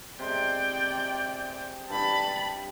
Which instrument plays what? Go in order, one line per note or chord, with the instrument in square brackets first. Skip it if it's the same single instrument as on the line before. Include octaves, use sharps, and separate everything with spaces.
[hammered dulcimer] C3 G#3 [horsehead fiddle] D5 G5
[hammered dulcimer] G2 [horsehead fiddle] A5 B5